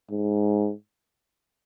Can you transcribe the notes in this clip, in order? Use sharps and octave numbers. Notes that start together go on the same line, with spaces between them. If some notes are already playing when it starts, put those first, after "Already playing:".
G#2